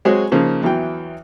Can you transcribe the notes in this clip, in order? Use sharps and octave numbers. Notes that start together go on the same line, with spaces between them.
F#3 G#3 C4 F#4 G#4 C#5
C#3 F3 A#3 D#4
E2 E3 F#3 G5